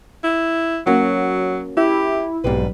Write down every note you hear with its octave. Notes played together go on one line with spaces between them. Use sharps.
E4
F#3 A#3 C#4 F#4
E4 G4
B1 G#2 G3 C4 B4